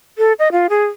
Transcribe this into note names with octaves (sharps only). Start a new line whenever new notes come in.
A4
D#5
F4
G#4